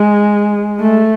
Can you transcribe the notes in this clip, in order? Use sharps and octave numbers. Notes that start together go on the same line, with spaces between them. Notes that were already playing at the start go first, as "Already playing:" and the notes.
Already playing: G#3
A3